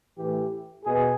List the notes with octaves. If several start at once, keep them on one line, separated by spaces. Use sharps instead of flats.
A2 E3 G4
B2 G#4